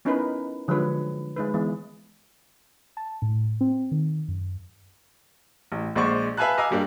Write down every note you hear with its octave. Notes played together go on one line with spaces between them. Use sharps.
B3 C#4 D#4 E4 A#4 B4
D3 F3 F#3 G#3 B4 C#5
G#3 D#4 B4
E3 G#3 B3
A5
A2
C4
D#3
F#2
A1
A#1 G#3 C5 D5 C#6
B4 E5 F5 G#5 A5 F#6
D#5 F5 G#5 A#5 D6 E6
G2 G3 A#3 D4